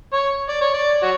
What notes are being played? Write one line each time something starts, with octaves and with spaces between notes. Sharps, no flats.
C#5
D5
C#5
D5
F#4 C#5